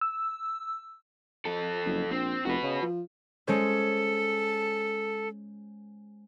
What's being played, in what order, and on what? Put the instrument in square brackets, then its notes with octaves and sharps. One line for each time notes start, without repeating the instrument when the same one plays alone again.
[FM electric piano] E6
[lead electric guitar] F2 A4
[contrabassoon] F#1
[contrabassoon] A#1 [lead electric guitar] C4
[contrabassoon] F1 [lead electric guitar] F#4 B4
[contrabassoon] C#3
F3
[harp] G#3 C#4 C5 [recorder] A4